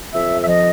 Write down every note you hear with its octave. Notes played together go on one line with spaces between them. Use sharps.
F2 E5
E5
F3 D#5